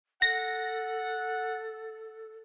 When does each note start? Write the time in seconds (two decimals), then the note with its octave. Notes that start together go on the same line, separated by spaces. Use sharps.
0.22 A4 F#5 A#6